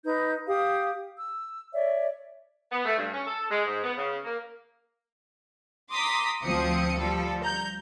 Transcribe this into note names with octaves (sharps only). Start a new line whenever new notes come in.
D#4 B4 G6
G4 F5 D#6
E6
C#5 D5 E5
B3
A3
G2
C#4
A4
G#3
G#2
B3
C#3
A#3
A#5 C6 D6 D#6 B6
D2 F3 C4 D#6 C#7
F3 G3 A4
A#5 G6